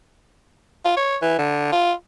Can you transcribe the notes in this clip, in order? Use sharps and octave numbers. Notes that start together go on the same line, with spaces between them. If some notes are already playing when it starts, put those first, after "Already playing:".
F4
C#5
E3
D3
F4